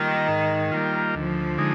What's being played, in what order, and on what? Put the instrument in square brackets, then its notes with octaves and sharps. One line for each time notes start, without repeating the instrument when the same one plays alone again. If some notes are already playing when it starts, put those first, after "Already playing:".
Already playing: [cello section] D#3 [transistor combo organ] G3 A#3 F4
[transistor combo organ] G#2
G3 A#3 F4
[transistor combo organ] D2 [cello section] F3
[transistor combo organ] D3 G#3 D#4